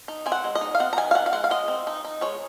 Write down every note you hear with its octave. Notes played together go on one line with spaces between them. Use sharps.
D#4
C4 G#5
F#5
G#3
D#5
D#4
F5
C4 F#5
A#5
D#3 G#5
F5
D#3 F#5
F5
G#3 F#5
F5
G#3 D#5
C4
D#4
D#4
G#3 C#5